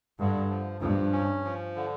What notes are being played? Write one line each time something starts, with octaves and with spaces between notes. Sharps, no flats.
G2 D3
F3
G2 F3
C#4
F3
D3